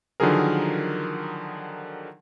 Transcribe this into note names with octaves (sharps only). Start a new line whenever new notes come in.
D3 D#3 F3 F#3 G#4 A#4